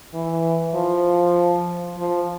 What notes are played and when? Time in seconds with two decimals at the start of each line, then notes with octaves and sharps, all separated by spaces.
0.14 E3
0.75 F3
1.98 F3